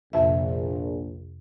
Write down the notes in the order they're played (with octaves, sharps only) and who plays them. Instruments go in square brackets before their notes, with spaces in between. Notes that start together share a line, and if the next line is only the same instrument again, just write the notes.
[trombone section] A#1 [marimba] F2 C3 E5